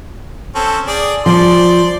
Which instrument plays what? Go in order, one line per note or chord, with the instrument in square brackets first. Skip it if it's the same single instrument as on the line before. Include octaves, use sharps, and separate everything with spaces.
[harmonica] C4 C#4 A4
G#4 D5
[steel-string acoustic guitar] F3 [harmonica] D5 C6